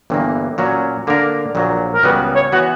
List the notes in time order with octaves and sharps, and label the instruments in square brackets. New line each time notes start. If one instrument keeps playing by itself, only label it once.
[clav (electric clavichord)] G1 G2 E3 A#3
A#2 F#3 C#4
D3 A#3 D4 A#4
A#1 A#2 F#3
[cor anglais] A#4
[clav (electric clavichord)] C#2 C#3 G3 B3 F#4 [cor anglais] B4
[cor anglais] C#5
[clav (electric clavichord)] E3 B3 [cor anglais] F#4